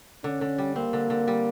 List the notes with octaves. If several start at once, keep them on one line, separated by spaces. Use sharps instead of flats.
D3 C#4
D3
G3
A#3 C4
D3
D3
G3